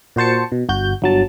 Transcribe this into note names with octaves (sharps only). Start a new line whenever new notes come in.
A#2 F#4 C5 A5 C#7
B2
G1 F#4 G6
G1 F#3 A5